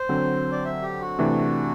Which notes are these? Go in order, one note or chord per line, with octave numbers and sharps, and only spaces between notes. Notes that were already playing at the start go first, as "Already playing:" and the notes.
Already playing: C5
D3 F#3 C4
D5
E5
G4
F#4
C3 E3 A3 D4